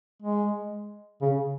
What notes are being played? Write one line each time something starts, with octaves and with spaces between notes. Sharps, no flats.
G#3
C#3